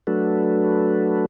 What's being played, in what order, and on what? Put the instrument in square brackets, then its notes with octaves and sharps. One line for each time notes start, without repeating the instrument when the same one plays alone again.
[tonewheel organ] F#3 A3 D4 F#4 A4 B4